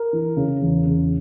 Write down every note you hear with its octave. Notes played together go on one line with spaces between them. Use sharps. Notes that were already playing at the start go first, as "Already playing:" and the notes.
Already playing: A#4
E3
C#3
E2
C#3